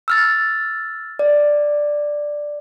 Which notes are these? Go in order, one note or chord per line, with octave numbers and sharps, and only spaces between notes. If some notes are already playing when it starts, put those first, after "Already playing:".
E6 F6 A6
D5